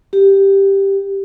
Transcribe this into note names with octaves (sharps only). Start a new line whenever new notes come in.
G4